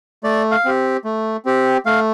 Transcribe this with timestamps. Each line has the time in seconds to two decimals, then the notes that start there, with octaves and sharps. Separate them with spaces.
0.24 A3 D5
0.51 F5
0.65 C4 G4
1.04 A3
1.45 C4 G4
1.86 A3 F5